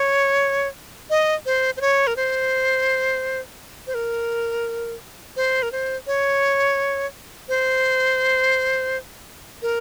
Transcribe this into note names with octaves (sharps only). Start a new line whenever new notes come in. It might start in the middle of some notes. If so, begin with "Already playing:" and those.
Already playing: C#5
D#5
C5
C5
C#5
A#4
C5
C5
A#4
C5
A#4
C5
C#5
C5
A#4